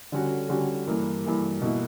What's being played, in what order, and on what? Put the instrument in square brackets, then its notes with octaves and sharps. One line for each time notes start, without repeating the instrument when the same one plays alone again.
[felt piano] D3 G3 C#4 F#4
D3 G3 C#4 F#4
G2 E3 A#3
G2 E3 A#3
B2 A#3 E4